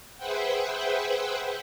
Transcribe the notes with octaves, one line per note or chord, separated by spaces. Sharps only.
G#4 B4 C5 E5 F#5 G5